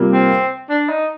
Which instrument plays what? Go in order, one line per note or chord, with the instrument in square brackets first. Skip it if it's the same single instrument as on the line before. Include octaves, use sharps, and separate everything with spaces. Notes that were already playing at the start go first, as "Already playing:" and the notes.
Already playing: [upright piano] C3 G3 A#3 F4
[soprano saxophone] C4
D4
D#4